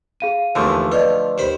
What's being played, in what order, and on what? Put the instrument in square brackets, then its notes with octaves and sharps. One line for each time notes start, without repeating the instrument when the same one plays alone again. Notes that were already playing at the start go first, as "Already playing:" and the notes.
[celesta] G#4 F5 D#7
[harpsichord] D#2 E3 [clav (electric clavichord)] D3 F3 A3
[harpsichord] F4 [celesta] B4 D5 D#5
[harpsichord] D#2 C5 B5